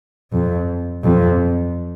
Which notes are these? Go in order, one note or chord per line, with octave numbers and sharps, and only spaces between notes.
F2
F2